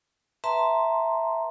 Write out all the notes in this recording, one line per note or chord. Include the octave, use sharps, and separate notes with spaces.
B4 E5 A5 A#5 C6